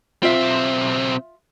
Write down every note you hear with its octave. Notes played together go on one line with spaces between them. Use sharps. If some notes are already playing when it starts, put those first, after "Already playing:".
B1 C4 F4 E5